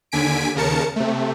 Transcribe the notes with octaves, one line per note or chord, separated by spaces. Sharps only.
D#2 D3 G#5 B6 D7
D#2 C#3 A#4 A5 C#7
C3 A3